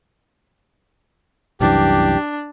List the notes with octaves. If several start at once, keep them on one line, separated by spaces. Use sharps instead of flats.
C2 F#2 E3 D4 G4